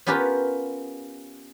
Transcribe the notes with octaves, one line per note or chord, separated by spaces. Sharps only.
B3 C#4 F4 G4 A#4 B4